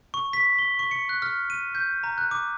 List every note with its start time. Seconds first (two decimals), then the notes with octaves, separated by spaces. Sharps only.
0.14 C#6
0.33 B6
0.59 G7
0.79 C#6
0.91 C#7
1.09 F#6
1.22 F6
1.50 D#7
1.75 G6
2.04 A#5
2.18 F#6
2.31 D6